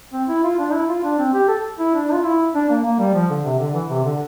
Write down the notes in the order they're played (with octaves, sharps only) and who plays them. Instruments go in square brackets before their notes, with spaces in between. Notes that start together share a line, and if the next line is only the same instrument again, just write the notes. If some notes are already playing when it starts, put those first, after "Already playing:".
[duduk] C4
E4
F4
D4
E4
F4
D4
C4
G4
A4
E4
D4
F4
E4
D4
A#3
A#3
G3
F3
D3
C3
D3
E3
C3
D3